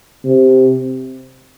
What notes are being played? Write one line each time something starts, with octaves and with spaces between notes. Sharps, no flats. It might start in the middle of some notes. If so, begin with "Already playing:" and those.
C3